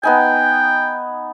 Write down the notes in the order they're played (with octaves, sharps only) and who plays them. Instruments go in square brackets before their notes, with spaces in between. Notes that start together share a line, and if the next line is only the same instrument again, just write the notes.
[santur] B3 D#4 G#5 [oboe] G5